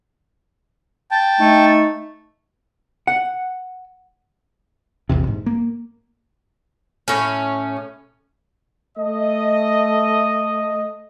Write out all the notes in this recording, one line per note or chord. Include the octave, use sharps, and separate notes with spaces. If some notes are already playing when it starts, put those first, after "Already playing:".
G5 A5
A3 D#4
F#5
A#1 E2 C3
G#2
A#3
A2 C#4
A3 D#5